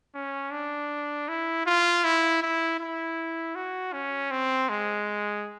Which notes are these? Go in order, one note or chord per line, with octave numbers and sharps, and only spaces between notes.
C#4
D4
E4
F4
E4
E4
E4
F#4
C#4
C4
G#3